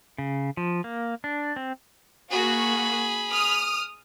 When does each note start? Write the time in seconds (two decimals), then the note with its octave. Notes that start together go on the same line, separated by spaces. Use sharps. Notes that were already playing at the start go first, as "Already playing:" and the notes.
0.18 C#3
0.57 F3
0.84 A#3
1.24 D4
1.56 C4
2.30 A#3 F#4 G#4 B5
3.31 D#6 F6